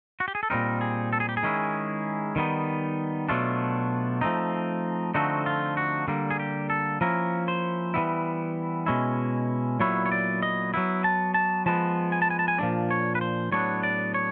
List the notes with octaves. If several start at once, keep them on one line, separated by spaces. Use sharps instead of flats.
F#4
G4
G#4
A4
A#2 G3 C4 D#4 A#4
G#4
A4
G#4
G4
G#4
D#3 G#3 C#4 E4
D#3 G3 B3 D#4
B2 F#3 A3 D4 F4
F3 A3 C4 D#4
D3 F3 A3 C4 D#4 F#4
F4
F#4
D3 G3 A#3
G#4
G4
A4
F3 A#3 C#4 E4 A#4
C5
E3 G3 B3 E4
B2 G#3 C#4 E4
A#2 F#3 B3 E4 C#5
C#5
D5
D#5
F#3 B3 E4
A5
A5
F3 G#3 B3 A5
G#5
A5
G#5
A5
G#5
A#2 F3 A3 D4 D5
C#5
B4
C5
A2 F#3 B3 D4 C#5
D5
C#5